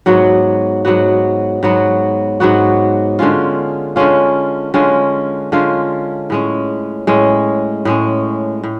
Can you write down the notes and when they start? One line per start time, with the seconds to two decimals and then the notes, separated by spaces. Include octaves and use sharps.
0.06 G#2 F#3 B3 F#4
0.85 G#2 F#3 B3 F#4
1.63 G#2 F#3 B3 F#4
2.40 G#2 F#3 B3 F#4
3.19 D3 G#3 C#4 F4
3.96 D3 G#3 C#4 F4
4.74 D3 G#3 C#4 F4
5.52 D3 G#3 C#4 F4
6.30 A2 G#3 C#4
7.07 A2 G#3 C#4
7.85 A2 G#3 C#4
8.63 A2